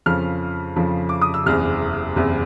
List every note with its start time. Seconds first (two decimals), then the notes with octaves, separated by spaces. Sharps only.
0.06 F2 C#3 F3 F6
0.76 F2 C#3 F3
1.09 D6
1.21 D#6
1.34 E6
1.46 F#1 E2 C3 F6
2.16 F#1 E2 C3